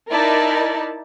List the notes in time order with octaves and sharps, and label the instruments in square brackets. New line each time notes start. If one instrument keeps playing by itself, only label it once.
[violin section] D#4 E4 A#4 D5 A5